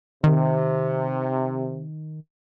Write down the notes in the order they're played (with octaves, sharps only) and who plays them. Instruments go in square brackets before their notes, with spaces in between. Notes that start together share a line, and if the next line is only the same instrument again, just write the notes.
[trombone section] C3 [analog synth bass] D#3